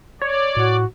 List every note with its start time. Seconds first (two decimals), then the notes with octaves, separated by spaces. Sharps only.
0.21 C#5 D5
0.57 A2 F#4